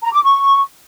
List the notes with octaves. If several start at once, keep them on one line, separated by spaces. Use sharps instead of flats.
A#5
D6
C#6